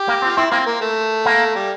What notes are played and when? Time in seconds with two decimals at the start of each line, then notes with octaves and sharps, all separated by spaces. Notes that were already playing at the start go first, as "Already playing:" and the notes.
Already playing: G4
0.08 A#3
0.22 C4
0.25 F4
0.37 C4 E4
0.51 A#3 C4
0.66 A#3
0.81 A3
1.25 A#3
1.55 G3